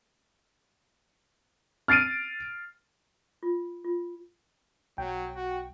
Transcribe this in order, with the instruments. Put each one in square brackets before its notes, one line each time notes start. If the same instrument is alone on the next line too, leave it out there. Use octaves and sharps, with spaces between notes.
[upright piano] F6 A6 C7 D7 D#7
[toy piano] F4
F4
[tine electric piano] B1 [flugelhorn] F#3 [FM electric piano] G5
[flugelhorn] F#4